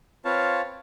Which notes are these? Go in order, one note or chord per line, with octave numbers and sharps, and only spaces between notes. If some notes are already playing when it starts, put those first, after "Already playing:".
C4 F4 B4 C#5 F5 A5